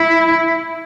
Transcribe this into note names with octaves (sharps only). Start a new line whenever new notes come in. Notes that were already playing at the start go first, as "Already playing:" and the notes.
Already playing: E4